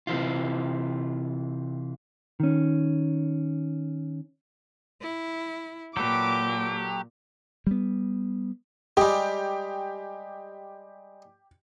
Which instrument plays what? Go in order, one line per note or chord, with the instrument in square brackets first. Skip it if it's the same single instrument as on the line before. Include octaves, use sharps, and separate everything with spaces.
[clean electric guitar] C3 E3 F4
D#3 C#4
[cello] E4
[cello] A#2 [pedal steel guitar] F#3 A4 B4 [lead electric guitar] G4 [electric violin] D6
[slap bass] G3 B3
[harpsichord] G3 G#3 [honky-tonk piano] G4